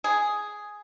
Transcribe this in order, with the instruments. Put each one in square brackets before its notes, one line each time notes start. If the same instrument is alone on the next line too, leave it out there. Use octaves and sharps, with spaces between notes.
[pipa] G#4